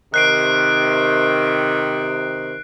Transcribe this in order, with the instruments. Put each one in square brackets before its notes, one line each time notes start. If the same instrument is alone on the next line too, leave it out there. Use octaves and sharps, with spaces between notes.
[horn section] C3 D#3 [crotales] F#6 C7 D7